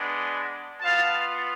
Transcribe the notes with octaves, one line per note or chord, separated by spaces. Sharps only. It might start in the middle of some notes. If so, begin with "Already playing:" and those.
Already playing: G#3 B3 D4
B3 F4 F5 A5